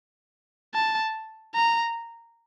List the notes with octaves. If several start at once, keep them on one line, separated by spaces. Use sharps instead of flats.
A5
A#5